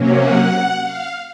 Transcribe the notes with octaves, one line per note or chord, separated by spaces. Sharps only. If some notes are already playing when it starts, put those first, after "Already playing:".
Already playing: C3 F#3 A#3 C#4
F#5
F5